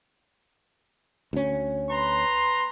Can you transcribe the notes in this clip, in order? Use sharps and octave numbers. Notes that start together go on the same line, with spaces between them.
D2 C#4
B4 A#5 C6